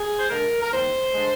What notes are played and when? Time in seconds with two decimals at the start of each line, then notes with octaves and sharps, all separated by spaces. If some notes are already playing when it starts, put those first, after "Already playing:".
Already playing: G#4
0.19 C5
0.30 D3 G#3 A#4
0.63 A#4
0.72 D#2 C5
1.15 D3 G#3